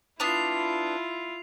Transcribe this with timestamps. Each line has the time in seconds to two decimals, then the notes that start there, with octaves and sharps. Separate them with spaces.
0.20 B3 D4 E4 F4 C7 F7